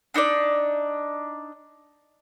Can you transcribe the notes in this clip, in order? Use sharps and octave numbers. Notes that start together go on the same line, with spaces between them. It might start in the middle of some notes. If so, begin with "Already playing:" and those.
D4 D#4 C5 D5